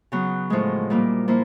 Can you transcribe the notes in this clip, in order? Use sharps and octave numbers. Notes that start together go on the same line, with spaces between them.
C#3 F#3 B3
A2 F3 G#3
A#2 G3 A#3
F3 A#3 E4